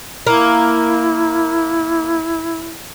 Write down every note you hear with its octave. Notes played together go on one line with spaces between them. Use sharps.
A#3 E4